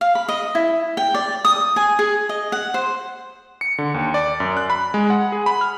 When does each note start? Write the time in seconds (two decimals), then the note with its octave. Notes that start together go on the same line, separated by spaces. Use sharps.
0.01 F5
0.15 B5
0.28 D#5
0.55 E4
0.97 G5
1.14 D5
1.45 D#6
1.76 G#5
1.99 G#4
2.29 D#5
2.52 F#5
2.74 C5
3.61 C#7
3.78 D3
3.94 D#2
4.14 D5
4.40 F#2
4.57 F#6
4.70 B5
4.94 G#3
5.10 F#5
5.32 G#4
5.46 B5
5.61 F6